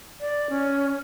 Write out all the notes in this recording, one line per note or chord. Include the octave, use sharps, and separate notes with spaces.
D5
C#4